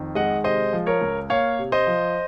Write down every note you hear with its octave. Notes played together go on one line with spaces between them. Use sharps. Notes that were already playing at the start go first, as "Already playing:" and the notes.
Already playing: F2 D#3
G#3 D#5 F#5
C3 C5 D#5
F3
A#4 C#5
C#2
A#3 C#5 F5
C3
C5 D#5
F3